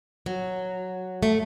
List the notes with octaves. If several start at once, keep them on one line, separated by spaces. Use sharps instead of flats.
F#3
A3